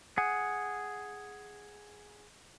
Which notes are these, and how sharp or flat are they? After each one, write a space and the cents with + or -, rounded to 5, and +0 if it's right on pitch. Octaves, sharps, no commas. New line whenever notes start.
G#4 +0 F#5 +0